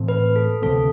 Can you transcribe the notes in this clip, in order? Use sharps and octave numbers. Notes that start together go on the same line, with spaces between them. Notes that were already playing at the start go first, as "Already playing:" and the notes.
Already playing: A2 E3 A3 C4
B4
A4
D2 C3 F3 C4 A4